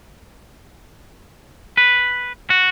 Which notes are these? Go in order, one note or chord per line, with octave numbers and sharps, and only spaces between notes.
B4
F#4